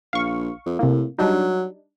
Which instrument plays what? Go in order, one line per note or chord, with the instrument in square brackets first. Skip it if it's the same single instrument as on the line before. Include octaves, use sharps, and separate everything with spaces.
[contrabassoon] A#1 [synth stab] F5 C#6
[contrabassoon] F2
[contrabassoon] A2 [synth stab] C3 A#3
[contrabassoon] F#3 [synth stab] G3 D4 D#4